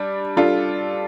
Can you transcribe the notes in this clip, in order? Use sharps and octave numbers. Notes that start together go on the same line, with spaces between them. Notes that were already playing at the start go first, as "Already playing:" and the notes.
Already playing: G3 D4
G3 D4 F4 A4